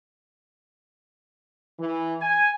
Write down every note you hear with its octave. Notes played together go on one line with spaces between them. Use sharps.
E3
G#5